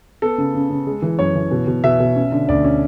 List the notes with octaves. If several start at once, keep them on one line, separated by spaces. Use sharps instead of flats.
B3 A4
C#3
C#3
C#3
G#3
E3
F#2 C#5
E3
B2
B2
B2 E5
B2
C#4
D3
D2 D5
C#4